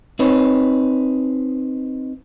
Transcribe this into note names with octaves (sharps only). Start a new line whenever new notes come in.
C4 D#4 B4 C#5